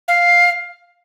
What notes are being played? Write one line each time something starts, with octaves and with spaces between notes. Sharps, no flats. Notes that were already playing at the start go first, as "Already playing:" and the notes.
F5